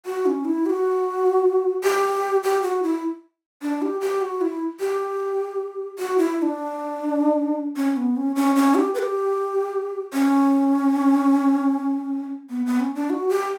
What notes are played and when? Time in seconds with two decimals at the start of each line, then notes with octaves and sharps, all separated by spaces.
0.06 F#4
0.26 C#4
0.45 E4
0.66 G4
0.70 F#4
1.84 G4
2.43 G4
2.62 F#4
2.83 E4
3.62 D4
3.82 G4
4.01 G4
4.22 F#4
4.41 E4
4.80 G4
5.99 F#4
6.18 E4
6.38 E4
6.42 D4
7.77 C#4
7.97 B3
8.17 C#4
8.36 C#4
8.56 C#4
8.75 G4
8.95 B4
8.99 G4
10.13 C#4
12.50 B3
12.66 B3
12.80 C#4
12.95 D4
13.10 F#4
13.29 G4